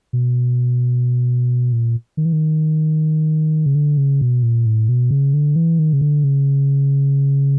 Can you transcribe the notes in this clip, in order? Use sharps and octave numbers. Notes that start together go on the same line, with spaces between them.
B2
A#2
D#3
E3
D#3
C#3
D3
C#3
B2
A#2
A2
B2
C#3
D3
E3
D#3
C#3
D3
C#3